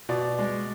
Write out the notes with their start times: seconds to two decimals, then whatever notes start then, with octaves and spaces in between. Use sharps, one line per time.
0.09 B2 D5
0.39 G#3